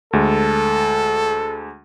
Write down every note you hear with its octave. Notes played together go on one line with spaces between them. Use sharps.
D2 G#3 A4